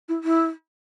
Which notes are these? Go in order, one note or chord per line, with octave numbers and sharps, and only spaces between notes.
E4
E4